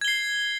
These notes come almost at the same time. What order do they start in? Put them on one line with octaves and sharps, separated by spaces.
G#6 G7 C7